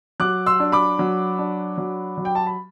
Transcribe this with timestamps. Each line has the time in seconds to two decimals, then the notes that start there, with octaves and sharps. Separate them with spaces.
0.20 F#3 D6 F#6
0.46 C6 E6
0.60 D4
0.72 B5 D6
0.99 F#3
1.39 D4
1.78 F#3
2.18 F#3
2.25 G5
2.35 A5
2.47 B5